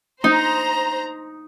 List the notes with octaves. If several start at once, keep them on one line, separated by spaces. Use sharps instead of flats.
D#4 C5 A#5